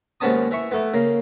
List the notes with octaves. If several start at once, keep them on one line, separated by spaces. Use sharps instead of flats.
D#2 G#2 B3 C#4 A5 D#6
E3 E5 C#6
E3 A3 B3
C#3 A#3